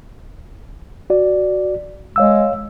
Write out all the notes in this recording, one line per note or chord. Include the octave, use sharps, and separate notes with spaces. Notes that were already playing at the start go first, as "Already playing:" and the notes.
F#4 D5
G#3 C#5 F5 E6